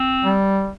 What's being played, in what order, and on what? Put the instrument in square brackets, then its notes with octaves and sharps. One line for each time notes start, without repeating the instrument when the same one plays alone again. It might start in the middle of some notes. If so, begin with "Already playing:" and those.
Already playing: [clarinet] C4
[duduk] G3